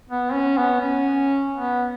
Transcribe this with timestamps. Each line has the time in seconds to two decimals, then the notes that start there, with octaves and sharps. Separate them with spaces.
0.10 B3
0.33 C#4
0.58 B3
0.81 C#4
1.53 B3